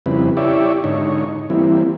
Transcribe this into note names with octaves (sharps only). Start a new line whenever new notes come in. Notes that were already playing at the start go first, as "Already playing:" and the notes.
F2 C#3 G3 C4 E4 B4
E4 G4 C#5 D5 E5
G#2 D3 D#4 C#5
E3 G3 A#3 C4 E4